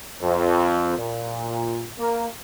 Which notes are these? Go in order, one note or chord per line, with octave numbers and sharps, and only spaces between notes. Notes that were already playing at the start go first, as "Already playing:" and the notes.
F2
A#2
A#3